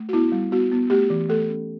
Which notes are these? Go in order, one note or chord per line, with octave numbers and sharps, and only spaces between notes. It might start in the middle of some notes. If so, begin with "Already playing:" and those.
Already playing: A3
F#4
B3 E4
G3
B3 F#4
B3
A3 G4
E3
A3 A4
C#4